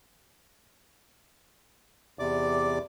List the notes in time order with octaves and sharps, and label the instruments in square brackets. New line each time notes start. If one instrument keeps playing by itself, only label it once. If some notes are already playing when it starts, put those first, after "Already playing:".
[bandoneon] E2 C3 D5 D6